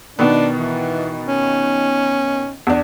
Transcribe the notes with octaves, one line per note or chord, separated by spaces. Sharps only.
B2 D#3 B3 D4
E3
C#4
E2 D4